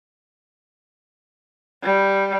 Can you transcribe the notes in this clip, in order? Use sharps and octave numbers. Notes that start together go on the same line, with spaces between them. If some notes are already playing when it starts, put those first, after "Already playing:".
G3